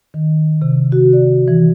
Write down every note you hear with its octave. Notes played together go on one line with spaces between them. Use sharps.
D#3
C3
F#4
D5
E3